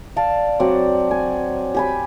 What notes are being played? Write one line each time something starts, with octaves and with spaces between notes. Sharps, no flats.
D5 F5 A5
F#3 C4 D5
G#5
G4 G#5 B5